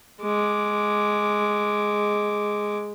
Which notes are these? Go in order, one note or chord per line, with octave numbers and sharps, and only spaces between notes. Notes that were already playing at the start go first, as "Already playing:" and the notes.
G#3 D6